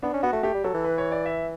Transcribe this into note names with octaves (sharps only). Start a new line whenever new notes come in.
B3 D4
C#4
B3 F#4
A3
A3 G4
G3
F#3 A4
E3
B4
C#5
D5
E5